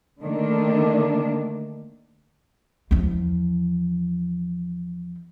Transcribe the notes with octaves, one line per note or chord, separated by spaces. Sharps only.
D3 D#3 A3 A#3 D4
E2 F3